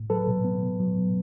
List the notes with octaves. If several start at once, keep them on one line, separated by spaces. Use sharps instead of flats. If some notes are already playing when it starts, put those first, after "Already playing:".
Already playing: A2
F#3 A4 B4
B2
B3
B2
F#3
B2